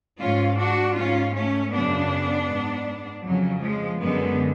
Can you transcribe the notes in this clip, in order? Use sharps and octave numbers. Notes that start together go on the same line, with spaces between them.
G#2 C#4 F4
D4 F#4
G#2 C#4 F4
A3 C#4
F#2 C#3 B3 D4
G#2
F2 C#3 F#3
F3 G#3
F#2 D3 G#3 B3